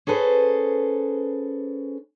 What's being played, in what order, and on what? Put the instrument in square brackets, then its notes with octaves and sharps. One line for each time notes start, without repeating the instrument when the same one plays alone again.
[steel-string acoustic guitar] C#4 G#4 A4 B4 C5